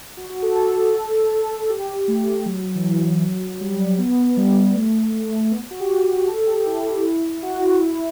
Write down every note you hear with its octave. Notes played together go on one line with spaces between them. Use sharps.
F#4
F#4
A4
A4
G4
A3
F#3
E3
F#3
G3
B3
G3
A3
A3
B3
F#4
G4
A4
G4
E4
F#4
E4